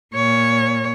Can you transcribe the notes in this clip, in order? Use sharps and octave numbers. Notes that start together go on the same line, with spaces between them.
A#2 C#5